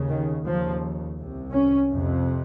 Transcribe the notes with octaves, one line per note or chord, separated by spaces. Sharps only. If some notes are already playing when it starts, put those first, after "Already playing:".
Already playing: D#2 C#3
D#3
D#2 C#3 F3
C2 C3
C#4
F2 C3